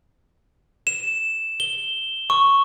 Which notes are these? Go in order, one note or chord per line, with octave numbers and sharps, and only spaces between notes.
E7
G7
C#6